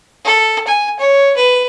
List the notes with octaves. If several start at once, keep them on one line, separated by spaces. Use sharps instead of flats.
A4
G#5
C#5
B4